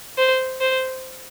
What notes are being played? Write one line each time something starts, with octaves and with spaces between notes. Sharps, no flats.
C5
C5